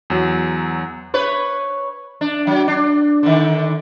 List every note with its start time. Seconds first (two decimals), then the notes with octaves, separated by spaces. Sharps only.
0.10 E2 F#3
1.14 B4 C#5
2.21 D4
2.47 F#3
2.68 D4
3.23 D3 D#3